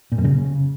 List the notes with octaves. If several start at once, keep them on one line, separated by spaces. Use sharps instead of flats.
A#2
F#2
C#3